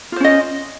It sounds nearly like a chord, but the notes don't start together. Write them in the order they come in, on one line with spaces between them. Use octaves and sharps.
F4 C5 C#4 D#5